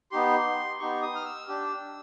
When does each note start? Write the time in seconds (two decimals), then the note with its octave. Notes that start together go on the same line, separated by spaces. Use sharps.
0.11 B3 D#4 G4 C6
0.80 B3 D#4 G4 C#6
1.02 D#6
1.15 F6
1.25 E6
1.48 D4 G4